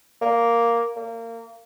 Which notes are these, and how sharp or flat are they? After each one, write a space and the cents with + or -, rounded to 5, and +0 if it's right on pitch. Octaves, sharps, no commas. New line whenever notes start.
A#3 +0
A#3 -25